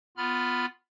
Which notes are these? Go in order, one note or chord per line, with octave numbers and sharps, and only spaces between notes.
B3 F4 B5 F6